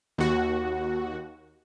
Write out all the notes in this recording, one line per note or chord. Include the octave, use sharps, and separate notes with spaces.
D#2 F#4